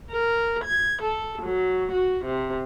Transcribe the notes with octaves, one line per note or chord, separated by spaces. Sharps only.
A#4
G#6
A4
F#3
F#4
C3